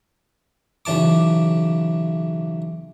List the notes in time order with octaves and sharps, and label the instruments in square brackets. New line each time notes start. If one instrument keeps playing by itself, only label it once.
[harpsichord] B1 C#3 E3 A5 D6